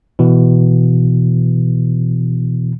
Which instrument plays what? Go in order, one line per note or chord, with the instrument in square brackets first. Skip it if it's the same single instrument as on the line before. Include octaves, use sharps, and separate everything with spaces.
[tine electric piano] B2 E3